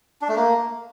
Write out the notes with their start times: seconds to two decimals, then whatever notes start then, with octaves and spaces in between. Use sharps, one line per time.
0.22 D4
0.29 A3
0.36 A#3